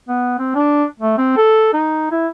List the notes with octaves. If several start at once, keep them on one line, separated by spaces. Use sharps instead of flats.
B3
C4
D4
A3
C4
A4
D#4
E4